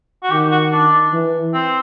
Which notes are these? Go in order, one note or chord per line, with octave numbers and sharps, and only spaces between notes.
F#4
D#3 G4
F#4
D4
E3
C4